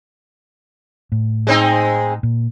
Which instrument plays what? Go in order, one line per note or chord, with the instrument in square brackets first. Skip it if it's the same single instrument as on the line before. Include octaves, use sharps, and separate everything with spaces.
[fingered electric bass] A2
[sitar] G#3 C4 D#4
[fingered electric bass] A#2